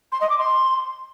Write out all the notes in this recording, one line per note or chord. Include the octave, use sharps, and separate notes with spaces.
C6
D#5
D6
C6